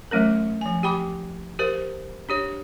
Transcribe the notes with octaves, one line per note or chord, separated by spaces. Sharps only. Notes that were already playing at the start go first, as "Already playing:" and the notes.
E3 F#3 A3 C#4 A#4
F3 G#5
G4 G5 B5 D6
G4 A#4 C5
D4 G4 C#5